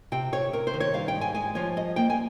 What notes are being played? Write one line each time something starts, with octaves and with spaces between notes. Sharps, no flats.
C3 G5
C3 C#5
C3 A#4
C5
D#3
C#5
G3 F5
G5
G#2
G#5
G#3 G#5
F3 C#5
G3 D#5
A#3 G5
G#5